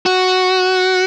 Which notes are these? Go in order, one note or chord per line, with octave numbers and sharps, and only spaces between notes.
F#4